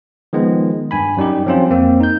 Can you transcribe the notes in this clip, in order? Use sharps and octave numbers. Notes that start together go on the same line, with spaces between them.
D#3 F3 G#3 B3
G2 G#5 B5
F#2 G3 D#4 G4
F3 F#3 C4 C#4 F4
F2 A#3 C4
D#4 G6